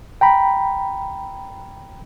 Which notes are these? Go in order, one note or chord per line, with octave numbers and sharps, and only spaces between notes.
G5 A#5 B5